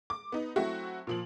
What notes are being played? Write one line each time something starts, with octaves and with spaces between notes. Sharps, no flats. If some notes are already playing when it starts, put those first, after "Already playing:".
D6
B3 D#4
F#3 A3 C4 E4 F#4
A#2 F3 F#7